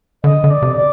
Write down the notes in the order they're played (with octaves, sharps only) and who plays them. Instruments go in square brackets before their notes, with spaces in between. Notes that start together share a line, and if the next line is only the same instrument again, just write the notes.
[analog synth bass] D3 [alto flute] D#5
[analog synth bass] D3
[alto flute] D5
[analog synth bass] C3
[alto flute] D5